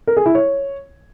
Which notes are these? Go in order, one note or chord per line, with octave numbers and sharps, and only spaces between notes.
A#4
G#4
E4
C#5